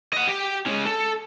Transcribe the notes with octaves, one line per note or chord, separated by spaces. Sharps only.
D#5 F#5
G4
G#3 C#4
A4